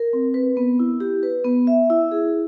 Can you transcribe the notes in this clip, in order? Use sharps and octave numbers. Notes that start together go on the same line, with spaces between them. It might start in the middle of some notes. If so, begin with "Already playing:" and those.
Already playing: A#4
C4
B4
B3
E4
G4
B4
B3
E5
E4
G#4